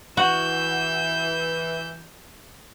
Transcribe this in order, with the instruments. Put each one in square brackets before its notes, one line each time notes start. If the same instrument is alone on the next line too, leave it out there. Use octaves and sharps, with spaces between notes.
[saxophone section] E3 [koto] F#4 [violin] E6 G6